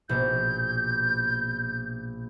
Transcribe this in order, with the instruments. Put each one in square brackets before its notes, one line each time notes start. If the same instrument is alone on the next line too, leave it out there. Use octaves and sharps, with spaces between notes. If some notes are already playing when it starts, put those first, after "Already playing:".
[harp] A#1 B2 [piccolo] G6